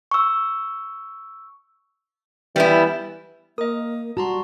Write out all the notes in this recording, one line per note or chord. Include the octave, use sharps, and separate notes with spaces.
C#6 E6
E3 G3 B3 E4
A#3 A#4 D#5 D#6
G3 F#4 A5 A#5 C6